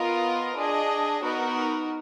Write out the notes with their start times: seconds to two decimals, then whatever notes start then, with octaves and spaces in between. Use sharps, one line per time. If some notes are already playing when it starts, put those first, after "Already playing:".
Already playing: B3 F4 A#4 D#5
0.56 D4 G#4 D#5
1.23 B3 D#4 F#4 A#4